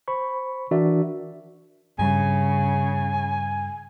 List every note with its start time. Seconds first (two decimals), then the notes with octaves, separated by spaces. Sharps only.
0.08 C5 B5 C#6
0.71 E3 D4 F#4 A#4 D5 E5
1.99 G2 C#3 G3 G#5